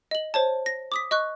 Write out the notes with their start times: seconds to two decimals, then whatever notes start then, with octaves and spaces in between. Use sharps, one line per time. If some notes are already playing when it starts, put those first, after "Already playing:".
0.11 D#5 F#7
0.34 C5 C#5 A5
0.66 A#6
0.92 D6 D#6 B6
1.11 D#5 C#6 F#6